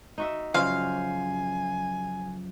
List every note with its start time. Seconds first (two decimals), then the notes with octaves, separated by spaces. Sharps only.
0.18 D#4 F#4 E5
0.54 F#2 C#3 F3 F#4 C5 F5 G5 G#5